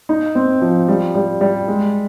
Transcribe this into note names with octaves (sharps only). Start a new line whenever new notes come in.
D#4
C4
F3
G3
G3
G3
G#3